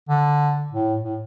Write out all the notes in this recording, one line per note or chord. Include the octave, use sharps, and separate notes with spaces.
D3
A2
A2